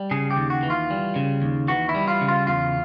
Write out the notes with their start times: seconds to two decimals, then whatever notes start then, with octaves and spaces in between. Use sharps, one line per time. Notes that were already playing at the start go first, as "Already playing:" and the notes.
Already playing: G3
0.11 C#3 G#4
0.31 G4
0.37 D#2
0.50 F#4
0.63 E3
0.70 F4
0.90 G3
1.16 C#3
1.42 D#2
1.68 E3 F#4
1.89 E4
1.95 G3
2.08 F4
2.21 C#3
2.28 F4
2.47 E2 F4